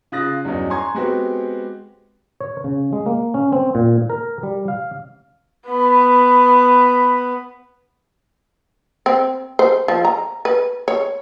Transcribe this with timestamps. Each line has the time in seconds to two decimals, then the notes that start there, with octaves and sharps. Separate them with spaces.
0.12 C#3 F4 D#6 F#6 A6 A#6
0.45 E2 G2 F#3 C#4 D#4
0.70 G#5 A#5 C6 C#6 G#6
0.95 G#3 B3 C4 F#4 G4
2.40 C#5
2.64 C#3
2.93 G#3
3.06 A#3
3.34 C#4
3.52 C4
3.75 A#2
4.10 A#4
4.43 G3
4.68 F5
5.68 B3 B5
9.06 C4
9.59 C5
9.88 F3
10.05 A#5
10.45 B4
10.88 C#5